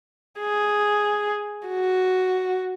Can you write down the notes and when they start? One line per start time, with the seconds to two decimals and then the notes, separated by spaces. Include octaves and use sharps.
0.39 G#4
1.67 F#4